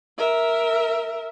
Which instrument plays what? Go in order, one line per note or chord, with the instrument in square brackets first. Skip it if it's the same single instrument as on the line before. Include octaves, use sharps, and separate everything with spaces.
[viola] A#4 E5